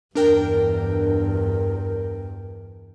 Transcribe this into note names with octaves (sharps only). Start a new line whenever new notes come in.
E2 G2 D4 A#4 G5